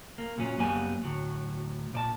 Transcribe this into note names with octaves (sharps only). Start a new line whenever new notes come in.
A#3
A#2 F#3 C#4
F#2 F#3 G3 A#3 B3 G#5
D2 A2 F#3
A#2 D5 A5